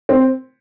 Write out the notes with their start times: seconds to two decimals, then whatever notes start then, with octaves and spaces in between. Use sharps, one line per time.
0.09 C4